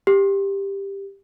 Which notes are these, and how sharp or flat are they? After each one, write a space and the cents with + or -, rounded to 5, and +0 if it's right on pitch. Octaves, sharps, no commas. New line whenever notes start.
G4 +10